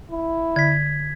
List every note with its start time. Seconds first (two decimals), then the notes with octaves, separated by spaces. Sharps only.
0.11 E4
0.56 D3 G#6 B6